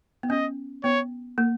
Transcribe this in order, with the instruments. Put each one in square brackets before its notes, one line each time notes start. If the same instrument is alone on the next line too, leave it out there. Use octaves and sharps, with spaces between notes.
[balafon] B3
[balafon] C#4 [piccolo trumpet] D#5
[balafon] B3 [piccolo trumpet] C#5
[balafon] A#3